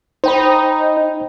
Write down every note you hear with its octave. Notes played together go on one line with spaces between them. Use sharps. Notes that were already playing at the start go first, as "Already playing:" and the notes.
D#4 C5 G5 B5